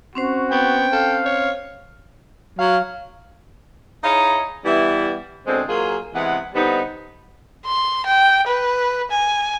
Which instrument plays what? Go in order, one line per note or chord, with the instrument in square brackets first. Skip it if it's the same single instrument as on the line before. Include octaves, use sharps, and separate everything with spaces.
[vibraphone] C4 C#4 C5 [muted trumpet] F#4
[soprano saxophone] B3 [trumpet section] G5
[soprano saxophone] A4 [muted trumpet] F5
[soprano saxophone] C#5
[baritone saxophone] F#3 [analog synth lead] F5
[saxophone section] D#4 E4 G#4 C#5 D#5 F5
E3 G3 B3 E4
B2 D3 G#3 C4
F#3 A#3 F4 G#4
C3 E3 G#3 B3 F#5
D3 G3 B3 C4 D#4
[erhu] C6
G5
B4
G#5